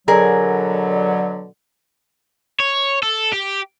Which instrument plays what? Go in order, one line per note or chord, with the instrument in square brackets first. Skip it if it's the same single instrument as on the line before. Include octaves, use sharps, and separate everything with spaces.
[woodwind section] B2 D3 F#3 [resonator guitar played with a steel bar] G#4 A#4
[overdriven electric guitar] C#5
A4
G4